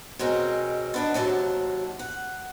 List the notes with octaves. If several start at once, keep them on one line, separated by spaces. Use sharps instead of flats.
B2 G#3 C4 C#4 A#4
B3 D4 D#4
D#2 C3 F#3 A5
F#5